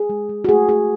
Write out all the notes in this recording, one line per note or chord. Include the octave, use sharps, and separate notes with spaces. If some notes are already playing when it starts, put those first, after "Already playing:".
Already playing: G#4
G#3
G#3
F#4
A3 G#4
A3 G#4